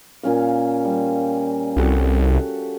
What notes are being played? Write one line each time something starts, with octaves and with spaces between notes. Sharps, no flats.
A#2 C#4 F5
G3
C2 F#4 G4 A4